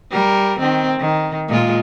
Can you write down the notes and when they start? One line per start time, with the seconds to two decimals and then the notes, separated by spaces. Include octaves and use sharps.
0.11 G3 A#4
0.59 D#3 C4
1.00 D#3
1.49 A#2 G#3 F4